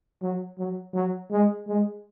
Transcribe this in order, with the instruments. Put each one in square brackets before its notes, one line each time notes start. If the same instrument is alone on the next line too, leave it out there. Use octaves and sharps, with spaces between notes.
[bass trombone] F#3
F#3
F#3
G#3
G#3